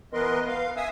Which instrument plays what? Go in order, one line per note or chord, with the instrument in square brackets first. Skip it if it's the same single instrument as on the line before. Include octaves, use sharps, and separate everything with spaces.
[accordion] E3 B3 A#4 B4 D#5 C6
F5
E5 G#5 D#6 E6